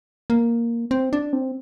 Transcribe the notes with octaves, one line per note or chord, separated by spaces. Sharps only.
A#3
C4
D4
C4